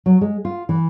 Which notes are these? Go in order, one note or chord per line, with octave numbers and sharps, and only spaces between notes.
F#3
G#3
F4
E3